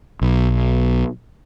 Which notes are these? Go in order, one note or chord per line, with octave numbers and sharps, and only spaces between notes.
B1